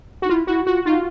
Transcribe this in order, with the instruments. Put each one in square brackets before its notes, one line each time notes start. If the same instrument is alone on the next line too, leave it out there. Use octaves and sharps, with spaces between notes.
[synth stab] F#4
[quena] D#4
[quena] E4 [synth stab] F4
[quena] E4 [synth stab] F#4
[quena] F4 [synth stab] F#4
[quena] D#4 [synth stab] F4